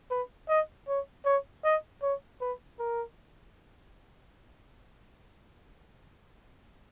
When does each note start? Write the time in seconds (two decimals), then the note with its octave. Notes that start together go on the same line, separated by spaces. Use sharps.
0.11 B4
0.49 D#5
0.88 C#5
1.25 C#5
1.64 D#5
2.02 C#5
2.41 B4
2.79 A#4